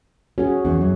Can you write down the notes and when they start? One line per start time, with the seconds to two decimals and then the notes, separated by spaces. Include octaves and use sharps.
0.38 C#4 F#4 G#4
0.65 E2 C#4
0.81 F#2